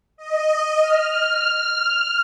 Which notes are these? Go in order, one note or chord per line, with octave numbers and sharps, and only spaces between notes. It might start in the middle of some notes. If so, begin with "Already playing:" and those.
D#5
F6